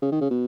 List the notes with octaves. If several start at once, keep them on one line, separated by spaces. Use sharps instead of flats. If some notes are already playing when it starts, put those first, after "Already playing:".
C#3
D#3
C#3
B2